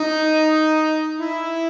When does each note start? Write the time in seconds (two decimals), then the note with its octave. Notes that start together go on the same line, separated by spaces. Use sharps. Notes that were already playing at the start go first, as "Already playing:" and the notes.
Already playing: D#4
1.20 E4